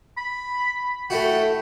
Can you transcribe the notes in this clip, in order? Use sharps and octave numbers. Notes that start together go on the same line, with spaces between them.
B5
A3 E4 F#4 G5